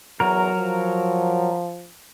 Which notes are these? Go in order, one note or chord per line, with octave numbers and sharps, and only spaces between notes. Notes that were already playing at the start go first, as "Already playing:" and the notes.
E2 F#3 A#4
F3